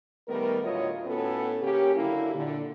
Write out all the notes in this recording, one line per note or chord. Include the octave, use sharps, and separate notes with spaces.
D#3 G3 A3 B3 A#4
D2 A2 F#3 F4 C#5 D#5
A2 B3 C#4 F#4 A4
C#3 A#3 C#4 G4
D3 F#3 A#3 E4
A#2 D3